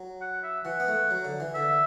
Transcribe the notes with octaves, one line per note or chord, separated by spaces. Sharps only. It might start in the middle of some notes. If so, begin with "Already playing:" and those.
Already playing: F#3
F#5
E5
E3 F#5
B3
A3
F#3
D3
E3
D3 E5